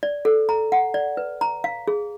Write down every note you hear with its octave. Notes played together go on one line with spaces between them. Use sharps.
D5
A4
A#5
F#5
D5
B4
A#5
F5
G#4